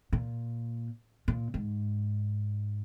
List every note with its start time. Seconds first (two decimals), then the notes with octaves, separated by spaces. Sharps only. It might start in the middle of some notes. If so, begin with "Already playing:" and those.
0.13 A#2
1.28 A#2
1.54 G#2